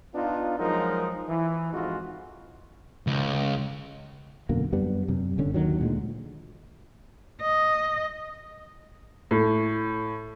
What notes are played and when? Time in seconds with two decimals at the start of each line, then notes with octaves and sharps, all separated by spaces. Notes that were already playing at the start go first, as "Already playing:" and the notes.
0.14 B3 D4 D#4 F4
0.59 F3 F#3 G#3 D#4 A#4
1.29 E3
1.73 F2 G#2 F4 F#4
3.07 C#2
4.49 F#2 B2 D3 A#3
4.72 F#2 G3 B3 D4
5.08 F#2 C3
5.38 G1 D3 C#4
5.54 D#2 D3 D#3 F#3
5.78 D2 A#2 G#3
7.42 D#5
9.31 A2